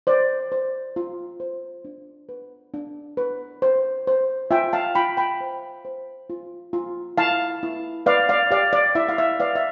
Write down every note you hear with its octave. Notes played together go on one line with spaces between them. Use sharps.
C5 D5
C5
F4
C5
D4
B4
D4
B4
C5
C5
F4 E5 G5
F5 A5
F4 G5 B5
G5 B5
C5
C5
F4
F4
E4 F5 A5
E4
B4 D5 F5
D5 F5
G4 D5 F5
D5
E4 E5
F5
E5
B4 D5 F5
E5